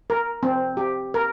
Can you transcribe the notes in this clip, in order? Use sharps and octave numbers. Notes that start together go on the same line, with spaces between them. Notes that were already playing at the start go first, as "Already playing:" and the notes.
A#4
C4
G4
A#4